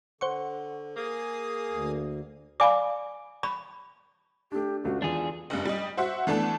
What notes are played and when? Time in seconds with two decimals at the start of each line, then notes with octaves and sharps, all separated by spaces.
0.21 D3 C5 F#5 C#6
0.97 A#3 G#4 D#6
1.70 D2
2.60 D5 F5 G#5 B5 D6
3.43 B5 C#6
4.52 A3 D4 G4
4.84 C#2 A3 F#4
5.02 E2 D4 F4 G#4
5.50 F#1 G2
5.65 G3 D#5
5.97 F#4 C5 E5 F#5
6.27 E3 A3 B3 D4 A4